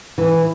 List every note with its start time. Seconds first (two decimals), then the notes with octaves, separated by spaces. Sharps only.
0.18 E3